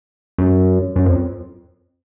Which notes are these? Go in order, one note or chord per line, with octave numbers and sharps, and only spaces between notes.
F#2
F#2
F2